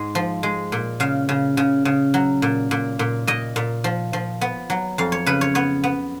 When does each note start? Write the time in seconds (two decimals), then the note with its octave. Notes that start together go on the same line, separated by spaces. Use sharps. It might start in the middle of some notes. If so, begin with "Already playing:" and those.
Already playing: G#2 G#3
0.15 F3
0.43 G#3
0.72 A#2
1.00 C#3 F5
1.29 C#3
1.57 C#3
1.85 C#3
2.14 F#3
2.42 A#2
2.71 A#2
2.99 A#2
3.27 A#2 D#5
3.56 A#2
3.84 F3
4.13 F3
4.41 B3
4.70 F#3
4.98 F2 F5
5.12 C#5
5.26 C#3 B4
5.41 C#5
5.55 B3 C#5
5.84 B3